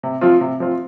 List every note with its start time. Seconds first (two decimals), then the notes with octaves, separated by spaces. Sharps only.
0.03 C3
0.21 F3 C4 F4
0.41 C3
0.60 F3 C4 F4